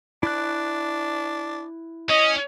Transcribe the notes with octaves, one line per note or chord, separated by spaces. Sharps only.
D4 E4 F#6
C#4 D#5